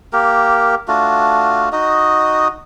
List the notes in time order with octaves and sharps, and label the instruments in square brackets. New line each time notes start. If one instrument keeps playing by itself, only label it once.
[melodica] A#3 G4 A#4
A3 D4 F4 F#4
D#4 F#4 D#5